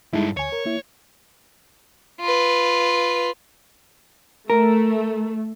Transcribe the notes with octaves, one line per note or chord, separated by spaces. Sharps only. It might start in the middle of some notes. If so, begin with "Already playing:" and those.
G2 G#3 D#4 E4 A4
D2 C#5 G#5
A#4
A#3 E4
F4 B4
A3 A#4